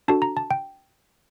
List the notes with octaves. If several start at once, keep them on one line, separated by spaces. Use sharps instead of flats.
D4 F#4 A4 A5
A#5
A5
G5